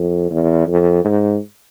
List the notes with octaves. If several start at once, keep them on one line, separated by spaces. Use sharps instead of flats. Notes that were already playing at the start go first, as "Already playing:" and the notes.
Already playing: F2
E2
F2
G#2